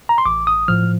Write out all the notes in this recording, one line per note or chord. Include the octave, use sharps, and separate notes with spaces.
A#5
C6
A1 D6
D#6
A2 F3 F6